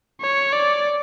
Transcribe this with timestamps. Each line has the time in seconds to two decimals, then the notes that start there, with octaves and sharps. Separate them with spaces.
0.21 C#5
0.52 D5